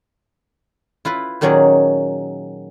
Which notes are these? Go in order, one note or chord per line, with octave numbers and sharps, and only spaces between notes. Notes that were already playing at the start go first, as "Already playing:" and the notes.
E4 F4 B4
A#2 D#3 F#3 C#4 G#4 D5